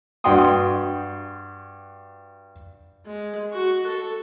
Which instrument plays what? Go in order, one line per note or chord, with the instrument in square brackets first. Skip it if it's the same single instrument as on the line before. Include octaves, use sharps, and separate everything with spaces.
[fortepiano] G2 F#4 G5 C6 D#6
[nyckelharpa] G#3
F#4 C#6
A4